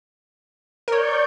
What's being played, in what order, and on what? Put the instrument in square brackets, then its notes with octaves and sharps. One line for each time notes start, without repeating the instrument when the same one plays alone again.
[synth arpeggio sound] A#4 C#5 [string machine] D5 C#6 G6